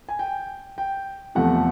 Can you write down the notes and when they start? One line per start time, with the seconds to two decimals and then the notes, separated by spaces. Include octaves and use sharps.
0.09 G#5
0.19 G5
0.78 G5
1.35 E2 C3 F3 A3 F#5